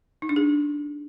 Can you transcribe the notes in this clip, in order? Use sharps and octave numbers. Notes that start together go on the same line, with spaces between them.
D#4
D4
G#4